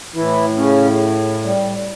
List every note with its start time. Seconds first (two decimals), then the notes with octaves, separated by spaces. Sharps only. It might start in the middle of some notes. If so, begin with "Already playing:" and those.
0.15 A2 E3 E4
0.57 C#3 C#4
1.44 G3